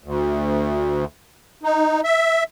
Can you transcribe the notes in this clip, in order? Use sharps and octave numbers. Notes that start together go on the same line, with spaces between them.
D2
D#4
E5